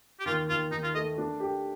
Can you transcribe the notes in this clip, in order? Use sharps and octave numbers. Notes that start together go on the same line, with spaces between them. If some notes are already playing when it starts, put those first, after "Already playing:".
G4
D#2 F4
D#2 F4
D#2 D#4
F4
A3 D#5
D4
G4